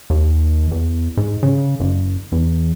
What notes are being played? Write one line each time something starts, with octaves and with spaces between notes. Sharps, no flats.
D#2
E2
G#2
C#3
F#1
E2